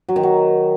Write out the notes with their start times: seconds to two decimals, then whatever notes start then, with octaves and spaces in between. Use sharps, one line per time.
0.09 F#3
0.16 D#3
0.23 F#3